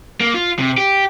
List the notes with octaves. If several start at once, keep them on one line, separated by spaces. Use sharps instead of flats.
A#3
F4
C3
G4